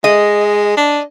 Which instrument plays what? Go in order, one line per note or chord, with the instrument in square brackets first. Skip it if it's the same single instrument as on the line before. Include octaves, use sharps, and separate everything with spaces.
[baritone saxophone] G#3 [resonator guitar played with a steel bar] D#5
[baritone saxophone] D4